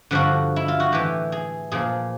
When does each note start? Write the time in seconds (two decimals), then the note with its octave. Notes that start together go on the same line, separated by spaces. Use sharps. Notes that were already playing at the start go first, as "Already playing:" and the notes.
0.11 G2 D3 F3 F#4
0.56 E4
0.68 F4
0.80 F#4
0.92 A2 E3 G4
1.32 G#4
1.72 A#2 F3 G#4